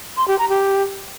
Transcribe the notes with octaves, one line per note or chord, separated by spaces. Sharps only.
C6
G4
A#5
G4